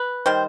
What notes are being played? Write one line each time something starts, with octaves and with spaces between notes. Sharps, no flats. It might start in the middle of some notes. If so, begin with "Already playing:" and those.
Already playing: B4
D#3 G3 C5